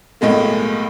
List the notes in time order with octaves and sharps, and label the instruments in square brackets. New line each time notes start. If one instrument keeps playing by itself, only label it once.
[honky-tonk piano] B1 A2 G#3 A#3